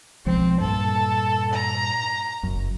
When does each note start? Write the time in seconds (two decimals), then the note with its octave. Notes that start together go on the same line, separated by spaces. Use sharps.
0.26 B1 F3 G#3 C4
0.61 G2 A#2 A4
1.53 A#5
2.43 F#1 F#2